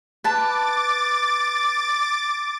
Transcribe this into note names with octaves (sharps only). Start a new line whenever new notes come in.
B4 A5 D6 A6